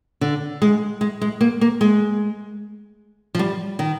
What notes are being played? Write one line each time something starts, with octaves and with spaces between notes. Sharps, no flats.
D3
G#3
G#3
G#3
A#3
A#3
G#3
F3
G3
D#3